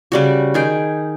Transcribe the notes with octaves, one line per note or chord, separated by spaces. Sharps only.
C#3 G3 F#4
D#3 G#4 G5